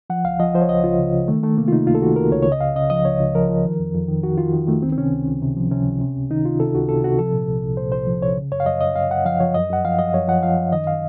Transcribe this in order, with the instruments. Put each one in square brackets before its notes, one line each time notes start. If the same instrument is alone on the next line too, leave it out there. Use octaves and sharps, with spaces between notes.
[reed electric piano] F3 F#5
C#2 F5
F3 D#5
F3 C5
C#5
C#2 D#5
C#2 F4
C#3
C#3
D#3 A3
D#3 A3
C3 A#3
F4
C3 D#4
C#2 F4
A4
D#3 F#4
C#2 A#4
C#2 C#5
C#3 C#5
D#5
C#2 F5
C#3 D#5
F3 D#5
C#2 C#5
C#2
F3 A#4
F3
D#3
F2
F2
D#3
D#3 F#4
D#3 F4
D#3
D#3 A3
C#2 C4
C4
C3 C#4
C#2
C#2
C3
F3
C3 C#4
C#2
C3
C#2
D#3 D#4
C3 F4
C3 A4
C#2 F#4
C3 A4
C3 F#4
F3 A4
A#2
C2
C2
A#2 C5
C2 C5
F3
C2 C#5
C#3
F#2 C#5
F5
F#2 D#5
F#2 D#5
F#2 F5
F#2 F#5
F3 F5
F3 C#5
F#2 D#5
F#2 F#5
F3 F5
F#2 D#5
F#2 C#5
F3 F#5
F3 F5
F#2
D#3 D#5
F5